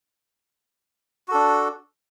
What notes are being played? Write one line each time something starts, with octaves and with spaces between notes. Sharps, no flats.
D4 F#4 A4